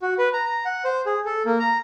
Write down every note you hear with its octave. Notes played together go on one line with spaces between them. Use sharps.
F#4
B4
A#5
A#5
F#5
C5
G#4
A4
A#3
A#5